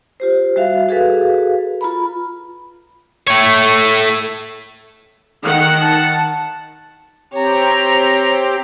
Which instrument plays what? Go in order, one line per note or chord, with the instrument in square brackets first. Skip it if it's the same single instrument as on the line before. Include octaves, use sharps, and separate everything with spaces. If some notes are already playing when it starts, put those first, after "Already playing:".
[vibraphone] F4 G4 C5
G3 F#4 E5 F5
F#4 G#4 A4 B4 F5
F4 A#5 B5
[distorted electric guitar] A3 C#5
[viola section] D#3 F#5
[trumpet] A5
[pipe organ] C4 G4 [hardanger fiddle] C#5 A#5